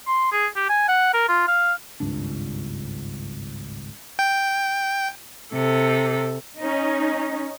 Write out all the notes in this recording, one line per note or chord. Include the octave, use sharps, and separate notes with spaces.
C6
G#4
G4
G#5
F#5
A#4
F4
F5
G#1 C#2 G2 D4
G5
C3 A4
C#4 D#4